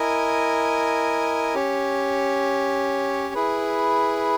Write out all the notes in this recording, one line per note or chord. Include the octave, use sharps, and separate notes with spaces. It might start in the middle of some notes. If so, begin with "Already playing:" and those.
Already playing: E4 A#4 D#5 G#5
C#4 G4 C#5
E4 G#4 B4